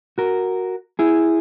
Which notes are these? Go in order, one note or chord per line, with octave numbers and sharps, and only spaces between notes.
F#4 A#4
E4 G#4